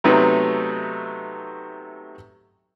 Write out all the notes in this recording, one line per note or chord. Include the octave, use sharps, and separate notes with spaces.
C3 F#3 A3 B3 D#4 B4